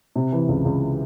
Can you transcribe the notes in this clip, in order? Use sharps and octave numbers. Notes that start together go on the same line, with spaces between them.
C3
E3
C#2
C#2